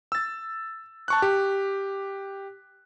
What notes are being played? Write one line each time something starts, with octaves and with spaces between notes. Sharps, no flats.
E6 A6
A5 C#6 F#6
G4